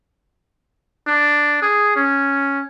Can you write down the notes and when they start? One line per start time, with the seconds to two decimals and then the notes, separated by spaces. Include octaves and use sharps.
1.07 D4
1.62 G#4
1.96 C#4